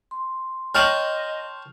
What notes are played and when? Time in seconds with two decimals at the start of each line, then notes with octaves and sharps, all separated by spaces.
0.11 C6
0.75 C#5 D#5 G5 A5 F6 F7 F#7